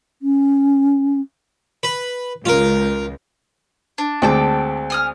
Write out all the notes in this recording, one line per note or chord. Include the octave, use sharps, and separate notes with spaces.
C#4
B4
C#2 F4 A#4
D4
D2 G#3 C4 G5 A5 D6
G#5 D#6 F6